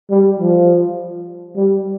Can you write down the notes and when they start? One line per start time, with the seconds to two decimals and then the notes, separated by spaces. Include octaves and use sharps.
0.10 G3
0.40 F3
1.56 G3